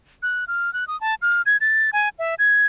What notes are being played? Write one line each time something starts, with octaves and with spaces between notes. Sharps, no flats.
F#6
F6
F#6
D#6
A5
F6
G#6
A6
G#5
E5
G#6